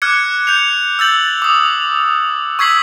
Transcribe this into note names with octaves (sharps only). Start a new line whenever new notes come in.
D6 F6 F#6 G#6 C#7
G6 C#7 F7
E6 G6 A6 F#7
D6 D#6
C#6 E6 G#6 B6 C7 F#7